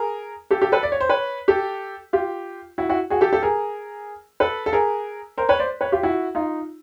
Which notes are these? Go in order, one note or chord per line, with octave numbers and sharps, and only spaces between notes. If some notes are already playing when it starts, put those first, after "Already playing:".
Already playing: G#4 A#4
G4 A4
G4 A4
A4 B4
D5
C#5
C5
B4 C#5
G4 A4
F4 G4
E4 F#4
E4 F#4
F#4 G#4
G4 A4
G4 A4
G#4 A#4
A4 B4
A4
G#4 A#4
A#4 C5
B4 C#5
C5 D5
B4 C#5
F4 G4
E4 F#4
D#4 F4